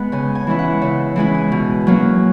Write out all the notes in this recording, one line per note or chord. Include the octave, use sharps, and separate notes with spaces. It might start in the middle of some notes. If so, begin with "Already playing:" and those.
Already playing: G#3 B3 F#5
C#3 G#5
G#5
E3 G#3 C#4 E4
F#5
C#3 E5
E3 G#3 C#4 E4 G#5
G#5
B2
F#3 A#3 C#4